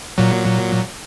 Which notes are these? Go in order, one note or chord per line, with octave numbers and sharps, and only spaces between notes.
A#2 F#3